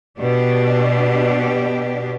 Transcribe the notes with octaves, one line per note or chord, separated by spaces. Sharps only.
B2 D4 G4